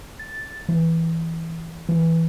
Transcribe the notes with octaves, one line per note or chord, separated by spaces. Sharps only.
A6
E3
E3